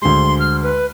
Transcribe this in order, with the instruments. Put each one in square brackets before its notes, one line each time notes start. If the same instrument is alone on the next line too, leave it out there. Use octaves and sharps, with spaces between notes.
[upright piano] D2 G#3 [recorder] C6
[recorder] F6
B4